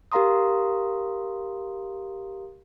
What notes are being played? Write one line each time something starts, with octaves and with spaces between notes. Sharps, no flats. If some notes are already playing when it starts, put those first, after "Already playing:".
G4 A#4 F5 A#5 C6 D#6